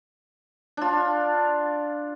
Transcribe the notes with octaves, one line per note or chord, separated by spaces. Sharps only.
D4 F4